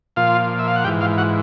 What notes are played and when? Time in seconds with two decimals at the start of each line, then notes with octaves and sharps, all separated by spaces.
0.16 A#2 F3 F4 F5
0.59 E5
0.68 F5
0.76 F#5
0.84 G#2 E3 G4 G5
1.01 F4 F5
1.18 F#4 F#5